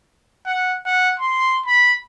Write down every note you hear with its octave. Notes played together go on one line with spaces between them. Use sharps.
F#5
F#5
C6
B5